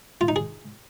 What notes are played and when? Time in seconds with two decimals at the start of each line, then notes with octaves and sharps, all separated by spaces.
0.21 F4
0.28 D#4
0.36 G#4